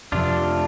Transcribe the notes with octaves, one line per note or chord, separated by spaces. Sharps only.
F2 C3 F3 D4 F4